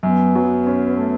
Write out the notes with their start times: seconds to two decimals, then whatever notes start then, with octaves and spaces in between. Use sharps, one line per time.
0.03 F#2 B3
0.35 F#3
0.67 C#4
0.97 A3